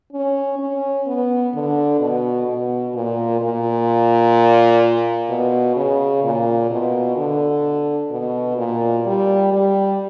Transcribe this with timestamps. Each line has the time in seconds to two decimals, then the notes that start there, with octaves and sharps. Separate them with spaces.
0.13 C#4
0.59 C#4
1.06 B3
1.54 D3
2.00 B2
2.47 B2
2.94 A#2
3.41 A#2
5.30 B2
5.76 C#3
6.24 A#2
6.71 B2
7.17 D3
8.11 B2
8.58 A#2
9.06 G3
9.53 G3